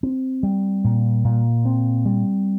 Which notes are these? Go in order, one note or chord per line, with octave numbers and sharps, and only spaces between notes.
C4
G3
A#2
A#2
C4
G3